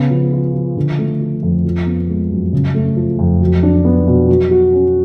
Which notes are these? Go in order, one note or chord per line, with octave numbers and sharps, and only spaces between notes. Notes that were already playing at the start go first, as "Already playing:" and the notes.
Already playing: C#3 B3
F3
F4
F3
D3
A3
F3
F2
F3
B3
G#3
F#2
C#3
A3
F3
F2
F#3
D4
B3
B2
F#3
F#4
C#4